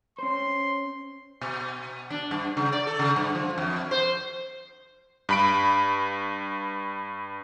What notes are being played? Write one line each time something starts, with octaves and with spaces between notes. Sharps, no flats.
C#4 C5 C6
B2
D4
G2
C#3
D5
A4
C#3
G2
F3
F2
C5
G2 B5 D7